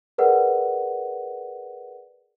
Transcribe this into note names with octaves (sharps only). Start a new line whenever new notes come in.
G#4 A#4 B4 D5 F#5